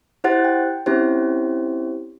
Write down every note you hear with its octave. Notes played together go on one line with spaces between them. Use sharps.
E4 G4 C5 F#5 F#6 A6
G5
C4 C#4 E4 G4 C5